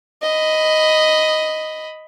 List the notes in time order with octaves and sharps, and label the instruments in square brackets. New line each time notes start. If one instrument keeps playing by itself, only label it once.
[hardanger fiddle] D#5 B5